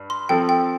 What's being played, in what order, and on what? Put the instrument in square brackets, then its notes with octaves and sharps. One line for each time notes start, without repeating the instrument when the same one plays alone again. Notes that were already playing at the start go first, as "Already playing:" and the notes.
Already playing: [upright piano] G2
[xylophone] C6
[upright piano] F3 C4 A4 [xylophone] G5
[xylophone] G5